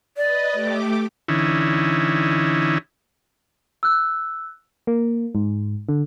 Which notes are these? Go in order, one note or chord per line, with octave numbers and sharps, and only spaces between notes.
B4 D5 D#5
A3 G4 D6
D3 E3 C#4 D#4 E4
E6 F#6
A#3
G#2
D3